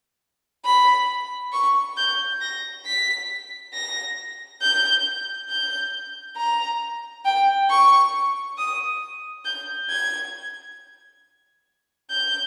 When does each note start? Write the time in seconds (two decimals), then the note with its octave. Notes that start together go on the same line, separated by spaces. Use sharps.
0.65 B5
1.53 C#6
1.97 G6
2.41 A#6
2.85 B6
3.73 A#6
4.62 G6
5.50 G6
6.37 A#5
7.25 G5
7.70 C#6
8.58 D#6
9.45 G6
9.89 G#6
12.10 G6